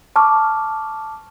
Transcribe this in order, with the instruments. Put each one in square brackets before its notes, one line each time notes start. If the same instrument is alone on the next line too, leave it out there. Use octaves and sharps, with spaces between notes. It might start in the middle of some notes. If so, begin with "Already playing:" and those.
[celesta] A5 C#6 D6 F6